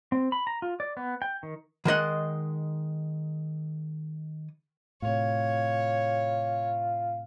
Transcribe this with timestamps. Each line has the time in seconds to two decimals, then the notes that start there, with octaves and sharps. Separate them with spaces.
0.12 C4
0.32 B5
0.47 A#5
0.62 F4
0.80 D5
0.97 B3
1.22 G5
1.43 D#3
1.85 D#3 G#3 D#5 F#5
5.02 A2 C3 F4 C#5